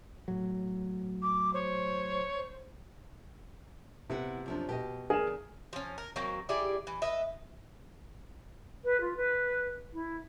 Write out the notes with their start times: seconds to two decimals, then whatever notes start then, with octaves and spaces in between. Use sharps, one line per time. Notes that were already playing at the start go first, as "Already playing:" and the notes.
0.28 A2 F#3
1.22 D6
1.53 C5 C#5
4.10 C3 B3 E4 F#5
4.46 F#2 F3 D4
4.69 B2 G4 D#5
5.10 E2 G#4 A#4 G#5 E7
5.73 F3 C#4
5.98 A#4
6.16 D#3 F#3 A#3 C4
6.49 E4 G4 G#4 D5
6.87 E3
7.02 B4 D#5 E5
8.84 B4
9.00 F4
9.17 B4
9.93 E4